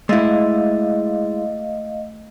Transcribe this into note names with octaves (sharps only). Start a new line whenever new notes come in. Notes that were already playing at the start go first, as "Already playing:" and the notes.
G#3 A3 E4 D#5 F5